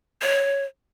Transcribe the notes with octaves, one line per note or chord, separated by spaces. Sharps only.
C#5